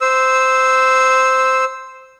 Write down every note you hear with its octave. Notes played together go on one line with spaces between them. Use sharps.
C5 E6